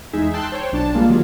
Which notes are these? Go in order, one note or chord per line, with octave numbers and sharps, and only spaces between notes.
E2 G#3 D#4 G#4 E5
G5 A5 C6 E6 F#6
C5 C#5 G5
B1 D4 A5
G3 G#3 A#3 F4
D#3 F#3 A#3 F4